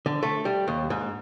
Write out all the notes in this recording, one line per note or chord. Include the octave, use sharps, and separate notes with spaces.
D3
A3
G3
D#2
G#2